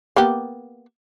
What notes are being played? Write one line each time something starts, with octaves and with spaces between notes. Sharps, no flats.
A#3 B3 G4